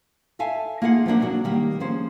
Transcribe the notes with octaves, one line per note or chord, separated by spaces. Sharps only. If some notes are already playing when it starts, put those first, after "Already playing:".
A4 E5 F5 G#5 A5
A#3 D#4 F4 G#4 F5 F#5
F3 F#3 A#3 D4
F#3 A#3 B3 D4 F#4
D#3 G3 A#3
F3 C#4 G#4 C5